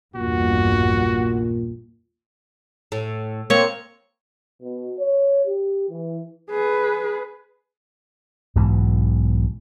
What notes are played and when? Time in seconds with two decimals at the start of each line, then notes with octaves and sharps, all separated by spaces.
0.15 A#1 E2 G2 A#2 F#4
2.92 A2
3.50 A#3 C4 C#5
4.62 B2
4.99 C#5
5.46 G4
5.90 E3
6.50 G#4 B4
8.56 B1 G#2 B2 E3